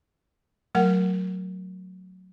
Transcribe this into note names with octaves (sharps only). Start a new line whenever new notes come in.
F#3 A3 A#4 F#5